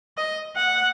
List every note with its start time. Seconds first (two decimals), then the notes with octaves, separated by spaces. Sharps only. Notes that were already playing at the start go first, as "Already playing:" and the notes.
0.17 D#5
0.56 F#5